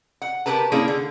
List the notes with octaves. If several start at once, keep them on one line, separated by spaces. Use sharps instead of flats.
F#5
B3 G4 A#4 B4 A5
A#3 C#4 D4 E4 G#4
D3